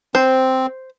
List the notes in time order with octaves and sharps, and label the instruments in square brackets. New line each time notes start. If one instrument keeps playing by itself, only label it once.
[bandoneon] C4 [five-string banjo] C5